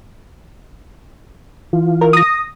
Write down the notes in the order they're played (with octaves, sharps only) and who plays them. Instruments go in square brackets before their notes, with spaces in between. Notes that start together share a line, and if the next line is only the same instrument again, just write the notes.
[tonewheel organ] E3 F4
[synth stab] A#4
D#6 A#6